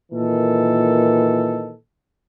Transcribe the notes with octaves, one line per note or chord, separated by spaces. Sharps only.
A#2 D#3 E3 A4